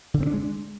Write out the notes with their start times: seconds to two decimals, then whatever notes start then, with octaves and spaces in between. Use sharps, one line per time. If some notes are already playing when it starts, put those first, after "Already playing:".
0.14 D3
0.20 C4
0.27 D4
0.33 G#3